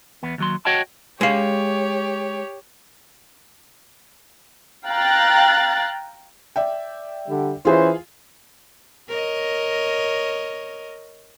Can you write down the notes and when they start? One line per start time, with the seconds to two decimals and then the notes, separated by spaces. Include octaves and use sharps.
0.23 E2 B3
0.38 D#2 F#3 C6
0.65 F#4 C#5 D#5 F#5 G5 A5
1.21 G#3 G4 C#5 F5
4.88 F5 G5 A#5 F#6 A6
6.56 D5 E5 G5
7.28 D3 G3
7.65 E3 C#4 F4 G#4 C5
9.09 A#4 C#5 D#5